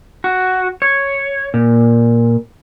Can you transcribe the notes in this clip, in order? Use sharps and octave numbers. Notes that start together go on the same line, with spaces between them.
F#4
C#5
A#2